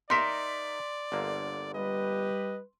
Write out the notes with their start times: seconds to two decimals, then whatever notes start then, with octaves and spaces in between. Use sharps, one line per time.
0.10 D#4 A#4 D5 E5 C6 B6
1.12 G1 D3 A#3
1.75 G3 G4 B4 D#5